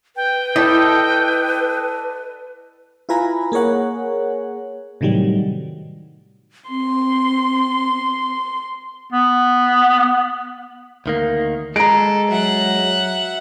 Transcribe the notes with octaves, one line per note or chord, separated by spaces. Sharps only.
B4 G5
E4 A4 D5 D#5
E4 F4 B4 G#5 A#5 B5
A#3 G#4 A#4 C#5 F#5
A2 C3 D#3 F#3 G3
C4 C6
B3
D2 D#3 A#3
G#3 A4 A#5 D7
F#3 E5 F#5